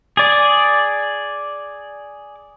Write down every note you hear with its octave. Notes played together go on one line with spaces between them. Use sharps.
G#4 D5